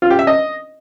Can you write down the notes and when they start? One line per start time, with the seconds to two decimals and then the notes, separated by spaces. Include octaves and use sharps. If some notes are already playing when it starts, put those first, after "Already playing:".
0.02 F4
0.10 G4
0.19 E5
0.27 D#5